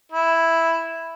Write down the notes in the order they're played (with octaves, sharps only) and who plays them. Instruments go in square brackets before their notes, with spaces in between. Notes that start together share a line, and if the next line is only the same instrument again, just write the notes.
[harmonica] E4